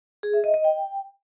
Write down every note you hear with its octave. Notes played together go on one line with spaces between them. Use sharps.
G#4
E5
D#5
D#5
G5